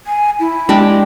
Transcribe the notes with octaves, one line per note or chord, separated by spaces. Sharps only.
G#5
E4
G#3 D4 G4